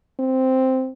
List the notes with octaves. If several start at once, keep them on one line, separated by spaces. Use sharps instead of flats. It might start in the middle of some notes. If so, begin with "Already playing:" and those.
C4